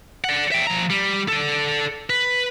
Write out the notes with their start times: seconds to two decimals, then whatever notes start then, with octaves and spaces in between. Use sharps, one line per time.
0.24 D5 F#5
0.52 E5 G5
0.67 F3 A#5
0.90 G3
1.28 A4 D5
2.10 B4